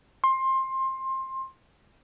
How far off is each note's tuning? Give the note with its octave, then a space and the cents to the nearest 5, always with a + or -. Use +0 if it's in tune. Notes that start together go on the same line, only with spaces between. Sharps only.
C6 +20